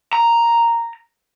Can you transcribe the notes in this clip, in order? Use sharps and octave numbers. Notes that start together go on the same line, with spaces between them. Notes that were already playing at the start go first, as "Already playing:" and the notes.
A#5